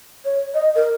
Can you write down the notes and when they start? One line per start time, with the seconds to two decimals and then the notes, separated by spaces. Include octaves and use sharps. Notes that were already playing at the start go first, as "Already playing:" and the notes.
0.25 C#5
0.54 D#5
0.76 A#4